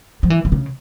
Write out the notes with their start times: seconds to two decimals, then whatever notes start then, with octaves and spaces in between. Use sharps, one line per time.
0.23 F3
0.30 E3
0.45 E3
0.52 C#3